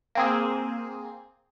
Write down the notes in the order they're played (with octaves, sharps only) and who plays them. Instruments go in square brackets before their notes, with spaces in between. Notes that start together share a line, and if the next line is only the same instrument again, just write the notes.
[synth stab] A#3 C4 G#4